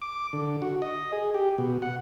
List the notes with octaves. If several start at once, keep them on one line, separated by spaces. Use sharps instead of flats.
D6
D3
F#4
D#5
G#4
G4
B2
F#5